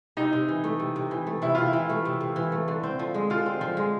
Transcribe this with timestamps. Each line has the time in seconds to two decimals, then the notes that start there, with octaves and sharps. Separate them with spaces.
0.17 C3 D#4
0.33 C3
0.49 E3
0.64 A3
0.80 C3
0.96 C3
1.11 E3
1.27 A3
1.42 C3 E4
1.55 C3 F4
1.68 E4
1.73 E3
1.89 A3
2.05 C3
2.21 C3
2.36 E3
2.52 A3
2.68 D3
2.83 C4
2.99 F3
3.14 G#3
3.30 D3 F4
3.46 C4
3.61 F3
3.77 G#3